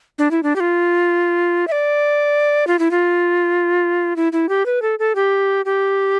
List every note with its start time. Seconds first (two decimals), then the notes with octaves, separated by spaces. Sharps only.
0.18 D4
0.31 E4
0.43 D4
0.56 G4
0.60 F4
1.68 E5
1.72 D5
2.67 F4
2.79 E4
2.91 F4
4.16 E4
4.33 E4
4.49 G4
4.66 B4
4.82 A4
4.99 A4
5.15 G4
5.65 G4